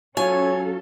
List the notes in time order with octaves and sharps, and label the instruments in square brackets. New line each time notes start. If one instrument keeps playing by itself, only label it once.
[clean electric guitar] F#3 F4 [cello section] C#4 A4 [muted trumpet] C#5 [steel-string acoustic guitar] G#5